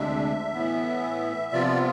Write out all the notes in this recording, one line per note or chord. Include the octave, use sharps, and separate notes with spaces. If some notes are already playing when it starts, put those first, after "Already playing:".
Already playing: D2 C3 G#3 D4 E5
A2 E3 B3
C3 F3 B3 F4 D5